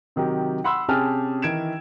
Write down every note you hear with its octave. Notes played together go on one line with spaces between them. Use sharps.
C3 D#3 F#3 G4
F#5 B5 C6 E6
C3 C#4 G4 G#4 A5 F6
D#3 E3 G#6 D7 E7